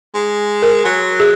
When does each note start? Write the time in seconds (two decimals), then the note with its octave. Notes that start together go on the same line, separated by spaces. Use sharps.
0.14 G#3
0.62 A#4
0.85 F#3
1.20 G#4